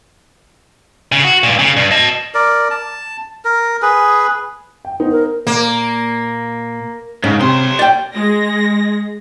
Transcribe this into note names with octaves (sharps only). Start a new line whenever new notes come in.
C#3
F#4
G2 A#2
C#3
G2
D#5 A5
A#4 D5
A5
A#4
G#4 B4
G5
B3 D#4 C5
A#4
A#2 A#3
G#2 C#3
C3 C#5 C6
D5 G5
G#3 A#6